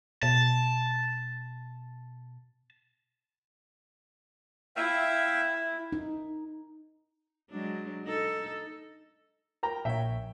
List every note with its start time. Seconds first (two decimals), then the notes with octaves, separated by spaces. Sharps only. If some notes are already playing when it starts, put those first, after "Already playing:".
0.23 B2 A5
4.76 E4 E5 F5 G5
5.92 D#4
7.50 F#3 G#3 D4
8.04 D#4 A4
9.63 A#4 G5 A#5
9.85 A#1 C#5 E5 G5